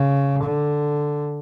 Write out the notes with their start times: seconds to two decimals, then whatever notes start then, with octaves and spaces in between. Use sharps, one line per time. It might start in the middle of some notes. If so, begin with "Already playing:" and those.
Already playing: C#3
0.44 D3